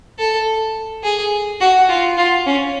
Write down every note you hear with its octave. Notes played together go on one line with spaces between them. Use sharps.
A4
G#4
F#4
F4
F4
C#4